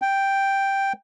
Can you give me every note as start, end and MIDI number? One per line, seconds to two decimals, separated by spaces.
0.02 0.93 79